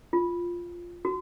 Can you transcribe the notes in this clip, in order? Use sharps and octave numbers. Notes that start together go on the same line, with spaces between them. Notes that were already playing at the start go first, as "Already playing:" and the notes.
F4
F#4